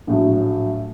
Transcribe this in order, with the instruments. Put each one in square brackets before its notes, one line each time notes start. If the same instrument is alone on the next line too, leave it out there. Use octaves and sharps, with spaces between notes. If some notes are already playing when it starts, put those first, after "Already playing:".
[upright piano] A#1 A2 F#3